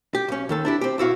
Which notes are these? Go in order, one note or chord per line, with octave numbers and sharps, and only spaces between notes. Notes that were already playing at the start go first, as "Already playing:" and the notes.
G4
B1 C#4
D#2 D#3 A4
D4 E4 G4
C4 G4
B1 E4 F#4 F5